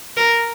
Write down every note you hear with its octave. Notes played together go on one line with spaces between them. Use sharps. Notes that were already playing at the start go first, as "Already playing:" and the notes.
A#4